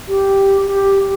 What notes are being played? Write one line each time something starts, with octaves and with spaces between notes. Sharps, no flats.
G4
G4